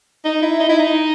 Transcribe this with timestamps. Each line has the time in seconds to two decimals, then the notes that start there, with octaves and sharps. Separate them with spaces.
0.25 D#4
0.42 E4
0.60 D#4
0.69 E4
0.79 D#4